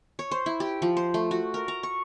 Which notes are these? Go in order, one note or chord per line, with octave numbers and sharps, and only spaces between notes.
C#5
C5
E4
G4
F3
C5
A3
F#4
A#4
A#5
C#6